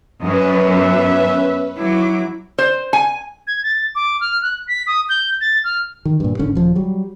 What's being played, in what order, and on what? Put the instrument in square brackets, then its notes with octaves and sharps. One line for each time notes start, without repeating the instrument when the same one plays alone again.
[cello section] F#2 [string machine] C#4 B4 [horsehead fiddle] D#5
[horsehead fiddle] B3 E5
[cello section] F#3 [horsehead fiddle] E4 [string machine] D6
[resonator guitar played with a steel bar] C5
G#5
[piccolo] G#6
A6
D6
F6
F#6
B6
D#6
G6
A6
F6
[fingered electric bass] D#3
G2 A#2
F#1 G#2 D3 C#4
D#1 F3
F#3 G3